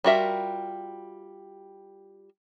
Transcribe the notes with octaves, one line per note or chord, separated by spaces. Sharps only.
G3 F4 F#4 A#4 E5